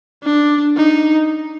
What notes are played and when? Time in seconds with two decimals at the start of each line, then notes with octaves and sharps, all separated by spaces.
0.24 D4
0.76 D#4